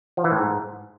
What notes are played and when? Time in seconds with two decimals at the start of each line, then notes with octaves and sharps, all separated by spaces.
0.17 F3
0.24 E3
0.31 A2
0.38 G#2